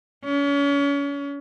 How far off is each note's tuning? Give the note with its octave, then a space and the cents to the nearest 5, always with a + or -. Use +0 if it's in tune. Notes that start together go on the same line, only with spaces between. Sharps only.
C#4 +35